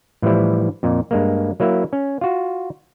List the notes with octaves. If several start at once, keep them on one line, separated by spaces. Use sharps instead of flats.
A2 E3 F3 G3 E4
F2 A#2
G2 G#3 A#3
F#3 A#3 E4 E5
C#4
F4 F#4